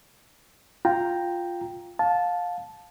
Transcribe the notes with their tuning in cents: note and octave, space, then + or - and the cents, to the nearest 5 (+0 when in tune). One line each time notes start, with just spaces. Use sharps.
F4 +0 G5 +0 A#5 +0
F5 +25 A5 -10